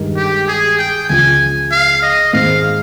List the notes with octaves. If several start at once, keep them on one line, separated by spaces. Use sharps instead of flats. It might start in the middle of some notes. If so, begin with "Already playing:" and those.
Already playing: G2 D#3 G#3 D#4 A#4
G4
G#4
G5
C#2 C#3 F3 G#5
F5
D#5
G#2 D#3 G#3 F5